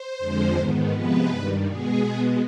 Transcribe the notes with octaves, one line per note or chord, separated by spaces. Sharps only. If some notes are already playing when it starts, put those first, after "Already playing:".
Already playing: C5
F2 D3 F3 G#3
G#2 D#3 B3
C3 F3 G#3 B3 B4
G2 D#3 G3
B2 G#3 B3 G#4
B2 G#3 B3